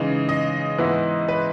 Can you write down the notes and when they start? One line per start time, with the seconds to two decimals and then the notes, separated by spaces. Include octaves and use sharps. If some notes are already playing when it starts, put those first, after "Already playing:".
Already playing: C#3 E3 G#3 D#4
0.29 D#5
0.78 G#2 E3 B3 E4
1.28 B4